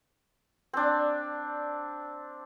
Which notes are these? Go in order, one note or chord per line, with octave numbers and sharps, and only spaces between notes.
C4 D4